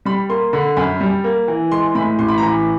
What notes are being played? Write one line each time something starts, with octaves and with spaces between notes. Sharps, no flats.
G3 B5
A#3 C6
D3 B5
F#2 B5
G3
A#3
E3
G#3 C6
A2 B5
A1 C6
B5
A#5
E3 B5